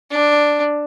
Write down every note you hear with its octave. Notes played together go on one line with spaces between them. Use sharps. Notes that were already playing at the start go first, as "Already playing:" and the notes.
D4